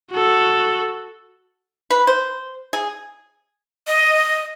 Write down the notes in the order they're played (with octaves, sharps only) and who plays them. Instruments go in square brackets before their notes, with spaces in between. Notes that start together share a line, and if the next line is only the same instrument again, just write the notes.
[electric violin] F#4 A4
[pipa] B4
C5
G#4
[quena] D#5